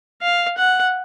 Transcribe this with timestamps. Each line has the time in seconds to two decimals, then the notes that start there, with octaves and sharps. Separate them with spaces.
0.22 F5
0.58 F#5